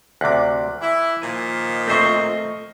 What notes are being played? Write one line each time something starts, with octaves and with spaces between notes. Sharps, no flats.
D2 C3 D6 F#6
E3 E4
A#2 D#3 F3 G#5
A3 C4 C5 D#5 C#6